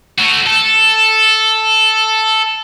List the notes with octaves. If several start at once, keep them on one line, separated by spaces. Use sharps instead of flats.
A3 F#4
A4